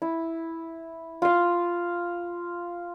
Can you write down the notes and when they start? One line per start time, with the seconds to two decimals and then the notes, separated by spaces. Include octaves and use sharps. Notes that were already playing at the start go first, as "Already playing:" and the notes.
0.02 E4
1.22 F4 F5